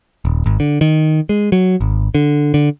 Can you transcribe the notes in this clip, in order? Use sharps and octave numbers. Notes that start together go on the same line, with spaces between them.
D#1
G#1
D3
D#3
G#3
F#3
G#1
D3
D3